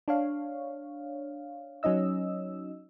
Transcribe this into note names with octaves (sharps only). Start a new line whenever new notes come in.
D4 C#5 F5
F#3 C#4 D#4 D#5 E6